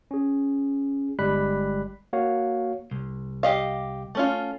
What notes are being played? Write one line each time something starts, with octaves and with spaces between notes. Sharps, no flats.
C#4 G#4
G1 G3 G#3 B5 F#6 B6
A#3 F#4 C#5 F5
C2
G4 D#5 F5
A3 C#4 F4